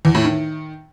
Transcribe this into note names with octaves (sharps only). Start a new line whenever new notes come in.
E2
A2
D#3